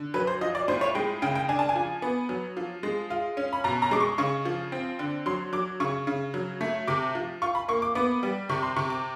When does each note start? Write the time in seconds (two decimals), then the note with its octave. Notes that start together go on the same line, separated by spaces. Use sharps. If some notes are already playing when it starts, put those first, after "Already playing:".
Already playing: D3
0.14 F#3 B4
0.27 C5
0.41 F3 D#5
0.55 D5
0.68 A2 C5
0.81 C#5
0.95 G#3 G5
1.22 C#3 G5
1.35 G5
1.49 D4 G#5
1.59 A5
1.69 G#5
1.76 F3
2.02 B3
2.29 F#3
2.57 F3
2.83 G#3
3.10 F4
3.37 C#4
3.53 B5
3.64 B2 A#5
3.82 A#5
3.91 G#3 D6
4.00 C#6
4.18 C#3 C#6
4.45 F3
4.72 C4
4.99 D3
5.26 F#3 C6
5.53 F#3 D6
5.80 C#3 C#6
6.07 C#3
6.34 F#3
6.61 A3
6.88 C3 D6
7.15 F3
7.42 F4 C#6
7.55 B5
7.68 A#3 C#6
7.82 D6
7.95 B3 D6
8.23 G3
8.49 C3 C#6
8.63 C6
8.76 C3 C#6
8.90 D6